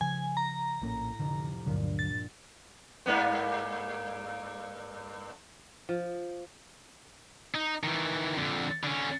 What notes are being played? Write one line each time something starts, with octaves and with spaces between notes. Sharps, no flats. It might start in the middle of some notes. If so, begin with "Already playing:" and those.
C#3 F3 G#5
A#5
A#1 A2 A#3 C#4
F1 D3
D2 G2 A#2 D3 F#3
A6
G2 A#3 B3
F3
D#4
D#3 E3
F2 D3
D3 C#4